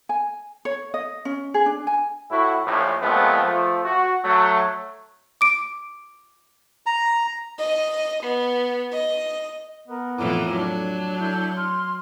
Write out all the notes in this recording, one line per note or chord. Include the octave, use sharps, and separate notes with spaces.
G#5
C#5
D#5
C#4
G#4
D4
G#5
A2 E4 F#4
A#1 A2
A#2 F3 G#3 A3 B3 C4
F3 A3
F#4
F#3 A3
D6 D7
A#5
D#5
B3
D#5
B3 A#4
F2 A2 E3 E4 A#4 D6
F#3 D4
A5
E4 A4 G6
C6 F6